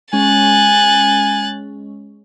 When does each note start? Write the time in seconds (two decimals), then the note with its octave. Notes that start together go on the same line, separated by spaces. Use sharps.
0.13 G#3 C#4 G#5 F#6 A6